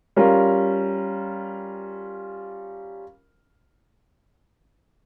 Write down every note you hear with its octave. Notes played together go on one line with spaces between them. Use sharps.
G3 C#4 F4 A#4